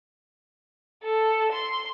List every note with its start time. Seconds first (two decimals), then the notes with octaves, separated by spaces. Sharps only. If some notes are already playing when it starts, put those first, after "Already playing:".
1.03 A4
1.52 C6